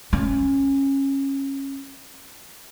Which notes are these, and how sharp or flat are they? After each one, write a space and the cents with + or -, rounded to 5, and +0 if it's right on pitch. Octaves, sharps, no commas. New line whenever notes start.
C#4 -20